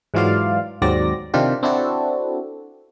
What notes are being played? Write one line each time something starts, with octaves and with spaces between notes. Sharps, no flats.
G#2 E3 F#3 F4 D5 F5
D#2 G#2 F#3 C4 D5 A#6
C3 D#3 D4 F4 G4
C4 D4 E4 F#4 A4